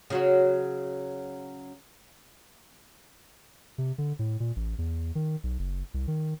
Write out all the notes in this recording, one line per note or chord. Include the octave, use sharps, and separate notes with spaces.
C#3 F#3 F#4
C3
D3
A2
A#2
A1
E2
D#3
B1
F#1
C2
D#3